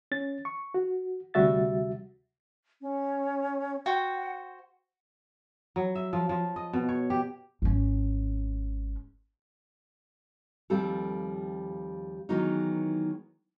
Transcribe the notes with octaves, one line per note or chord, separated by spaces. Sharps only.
C#4 A6
C#6
F#4
D2 C3 G3 F#4 E5 A6
C#4
F#4 C5 F#5 G5
F#3
E5
F3
F3
D#5
B2
C#5
G4
G#1 C#4
D#2 F3 G3 C4 G4 A4
D#3 E3 F#3 G#3 B3 D#4